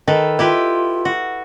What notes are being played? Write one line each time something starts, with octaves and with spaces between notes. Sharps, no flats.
D#3 A4 B4
E4 F4 G4 B4
F#4